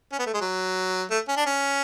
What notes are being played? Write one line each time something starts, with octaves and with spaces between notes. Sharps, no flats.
C#4
B3
A3
G#3
F#3
A3
C#4
D4
C#4